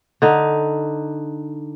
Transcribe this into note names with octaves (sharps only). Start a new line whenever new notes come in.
D3 D#4